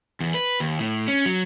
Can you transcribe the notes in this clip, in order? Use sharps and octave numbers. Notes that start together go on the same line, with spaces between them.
E2
B4
D#2
A2
C#4
F#3